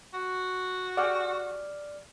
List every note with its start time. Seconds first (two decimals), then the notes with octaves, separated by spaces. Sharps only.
0.14 F#4
0.97 G4 G#4 D5 F#5 F6